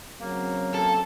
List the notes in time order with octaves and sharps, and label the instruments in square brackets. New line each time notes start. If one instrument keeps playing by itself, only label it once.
[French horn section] C#3 F#3 C4 [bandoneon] A#3
[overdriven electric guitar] A4